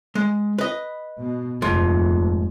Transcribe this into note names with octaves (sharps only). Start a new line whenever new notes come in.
G#3
B4 D#5
B2
F1 D#2 G#2 F3